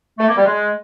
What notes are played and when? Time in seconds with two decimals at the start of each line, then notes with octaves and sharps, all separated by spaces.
0.19 A3
0.27 A#3
0.36 G3
0.45 G#3